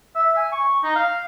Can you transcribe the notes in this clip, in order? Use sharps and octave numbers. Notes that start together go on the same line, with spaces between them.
E5
G#5
C#6
D#4
F5